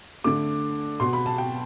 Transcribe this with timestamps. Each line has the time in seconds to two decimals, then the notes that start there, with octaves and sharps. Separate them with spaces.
0.24 D3 A3 D6
1.00 B2 B3 C6
1.13 B5
1.26 A5
1.38 G5